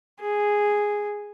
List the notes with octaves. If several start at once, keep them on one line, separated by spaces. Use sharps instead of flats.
G#4